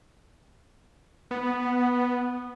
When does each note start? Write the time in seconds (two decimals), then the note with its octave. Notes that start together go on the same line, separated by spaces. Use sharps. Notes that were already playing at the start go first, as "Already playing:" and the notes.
1.31 B3